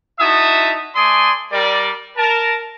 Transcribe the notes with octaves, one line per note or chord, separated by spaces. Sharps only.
D#4 E4 F#4 E5 A5 D#6
A3 D5 G#5 C6 D#6
G3 A#4 D5
A#4 A5